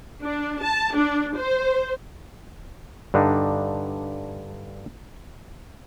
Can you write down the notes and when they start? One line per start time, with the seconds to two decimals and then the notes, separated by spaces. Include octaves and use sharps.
0.24 D4
0.62 A5
0.93 D4
1.36 C5
3.14 G2 D3 D4 D#4